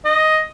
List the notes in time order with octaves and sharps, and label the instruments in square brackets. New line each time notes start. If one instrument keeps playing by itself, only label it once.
[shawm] D#5